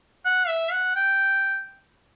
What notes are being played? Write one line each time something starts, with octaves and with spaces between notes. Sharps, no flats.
F#5
E5
F#5
G5